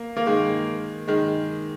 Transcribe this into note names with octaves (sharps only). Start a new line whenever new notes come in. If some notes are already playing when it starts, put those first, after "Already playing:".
Already playing: A#3
A#3
D#3 G#3
D#3 G#3